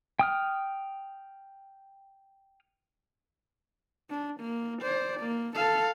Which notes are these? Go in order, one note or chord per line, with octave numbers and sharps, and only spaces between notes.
G5 D#6 F6
D4
A#3
C5 D5
A#3
A4 F5